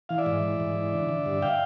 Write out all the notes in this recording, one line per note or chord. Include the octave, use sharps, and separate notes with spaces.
E3 F5
D5 E5
G#2
E3
G#2
E3
D3
D3
G2
F5 G5